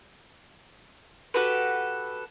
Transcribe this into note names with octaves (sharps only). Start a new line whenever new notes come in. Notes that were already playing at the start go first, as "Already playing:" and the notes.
F#4 G4 A4 B4